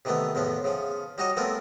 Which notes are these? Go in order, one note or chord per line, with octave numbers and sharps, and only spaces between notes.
C3 D#3 E3 A3 B3
E2 A2 F3 B3
C#3 F3
G3 D#4 F#4 C#5 D#5
F3 A3 B3 C4 F4 A#4